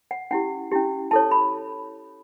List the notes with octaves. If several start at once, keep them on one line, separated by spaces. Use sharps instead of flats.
F#5
C#4 E4 G4 F#5
C#4 E4 G4
E4 A4 C#5 A5
B5